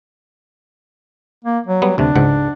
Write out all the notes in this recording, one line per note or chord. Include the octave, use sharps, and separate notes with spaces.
A#3
F#3
G3 B3
D2 C3 D4
C#2 G#2 F#5